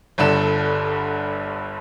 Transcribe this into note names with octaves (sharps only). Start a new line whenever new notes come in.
G1 G2 D3 A4 E7